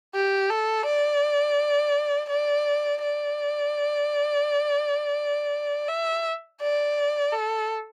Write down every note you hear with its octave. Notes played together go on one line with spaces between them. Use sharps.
G4
A4
D5
D5
D5
E5
D5
A4